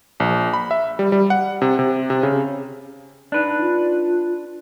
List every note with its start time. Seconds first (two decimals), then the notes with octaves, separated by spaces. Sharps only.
0.20 A#1
0.53 B5
0.71 E5
0.99 G3
1.12 G3
1.30 F#5
1.62 C3
1.79 C3
2.10 C3
2.23 C#3
3.32 D4 D#4 B4
3.61 F4